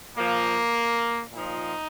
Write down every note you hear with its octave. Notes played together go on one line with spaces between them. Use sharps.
A#2 F3 A#3
A#2 F3 D#4